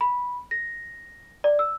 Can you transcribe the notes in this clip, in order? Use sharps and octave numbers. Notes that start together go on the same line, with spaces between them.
B5
A#6
D5
E6